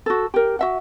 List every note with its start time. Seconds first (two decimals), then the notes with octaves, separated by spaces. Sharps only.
0.06 F#4 A4
0.34 G4 A#4
0.59 F#4 E5 F#5